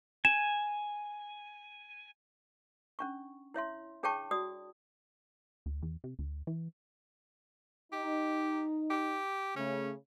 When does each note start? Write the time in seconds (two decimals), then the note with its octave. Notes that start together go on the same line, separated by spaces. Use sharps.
0.25 G#5 E7
2.99 C#4 D4 C#6
3.54 E4 C#5 E5 C6
4.03 D4 G#4 C#5 G5 A5 C#6
4.31 F#4 D5 D#6
5.66 D2
5.83 E2
6.04 C3
6.19 D2
6.47 E3
7.93 D#4 G4
8.91 G4
9.56 C#3 A3 C#4